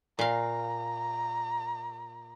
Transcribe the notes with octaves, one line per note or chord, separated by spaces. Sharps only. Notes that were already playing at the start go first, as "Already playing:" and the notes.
A#2 F5 A#5